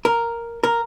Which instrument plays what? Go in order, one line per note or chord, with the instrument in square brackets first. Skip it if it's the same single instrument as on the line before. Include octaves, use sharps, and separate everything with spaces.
[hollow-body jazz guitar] A#4
A#4